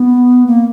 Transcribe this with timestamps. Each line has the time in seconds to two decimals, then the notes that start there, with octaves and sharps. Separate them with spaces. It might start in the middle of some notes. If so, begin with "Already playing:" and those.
Already playing: B3
0.47 A#3